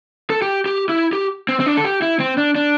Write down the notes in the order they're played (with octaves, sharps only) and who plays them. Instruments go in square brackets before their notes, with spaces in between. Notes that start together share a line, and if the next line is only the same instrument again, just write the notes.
[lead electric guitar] A4
G4
G4
E4
G4
C4
C4
D4
A4
G4
E4
C4
D4
D4